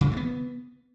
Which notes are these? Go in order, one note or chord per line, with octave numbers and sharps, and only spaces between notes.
C#3
E3
A3
B3